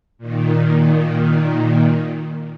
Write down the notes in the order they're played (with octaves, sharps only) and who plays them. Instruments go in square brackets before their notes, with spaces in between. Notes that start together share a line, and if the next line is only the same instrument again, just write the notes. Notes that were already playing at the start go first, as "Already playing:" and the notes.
[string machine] A#2 D#3